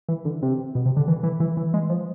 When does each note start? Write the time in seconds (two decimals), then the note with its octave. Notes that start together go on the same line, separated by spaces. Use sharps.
0.08 E3
0.25 D3
0.42 C3
0.75 B2
0.86 C3
0.97 D3
1.08 E3
1.23 E3
1.40 E3
1.57 E3
1.74 G#3
1.90 F3